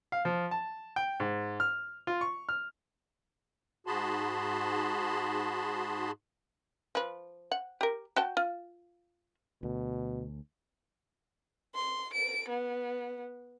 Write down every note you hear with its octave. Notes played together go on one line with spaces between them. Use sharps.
F5
F3
A5
G5
G#2
F6
F4
C#6
F6
G#2 F#4 G#4 A5 B5 C6
F3 B4
F#5
G4 A#4
F#4 G5 A5
F4
D2 B2
C6
D7
B3